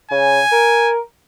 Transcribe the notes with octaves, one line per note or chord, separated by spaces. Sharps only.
C#3 G#5
A#4